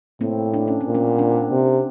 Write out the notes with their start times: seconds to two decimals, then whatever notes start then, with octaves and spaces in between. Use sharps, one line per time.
0.21 A2 A#3 C4
0.54 D4
0.68 C#4
0.81 C4
0.86 A#2
0.95 B3 C#4
1.19 C4 D4
1.52 C3